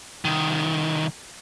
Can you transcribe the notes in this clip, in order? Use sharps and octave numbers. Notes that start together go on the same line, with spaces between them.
C2 D#3